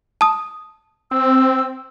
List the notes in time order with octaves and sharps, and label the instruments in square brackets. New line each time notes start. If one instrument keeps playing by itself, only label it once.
[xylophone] A5 D#6
[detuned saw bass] C4 [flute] E6